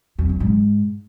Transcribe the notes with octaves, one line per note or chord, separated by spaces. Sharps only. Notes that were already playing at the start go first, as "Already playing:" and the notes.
F2
F#2
G#2